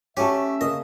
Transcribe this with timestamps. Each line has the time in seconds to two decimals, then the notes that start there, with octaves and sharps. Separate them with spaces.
0.17 A3 C#4 G4 E5
0.61 C#3 A#3 D#5